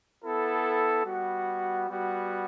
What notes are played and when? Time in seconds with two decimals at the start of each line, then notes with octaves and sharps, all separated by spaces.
0.23 B3 E4 A4
1.05 G3 B3 F#4
1.88 G3 B3 F#4